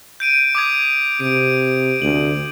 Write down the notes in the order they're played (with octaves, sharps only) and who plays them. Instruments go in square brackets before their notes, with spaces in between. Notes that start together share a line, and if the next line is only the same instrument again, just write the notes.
[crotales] G6 D7 D#7
D6 D#6 G#6
[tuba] C3 [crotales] D7
[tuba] D2 [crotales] F#7